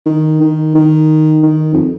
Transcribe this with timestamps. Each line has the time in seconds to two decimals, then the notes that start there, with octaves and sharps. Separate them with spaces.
0.06 D#3
0.40 D#3
0.75 D#3
1.43 D#3
1.73 F2